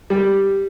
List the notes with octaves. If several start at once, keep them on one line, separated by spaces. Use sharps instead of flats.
G3